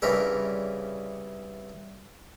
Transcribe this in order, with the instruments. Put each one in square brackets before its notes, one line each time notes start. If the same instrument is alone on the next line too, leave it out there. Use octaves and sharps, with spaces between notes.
[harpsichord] C2 C#3 E3 D4 A#4 B5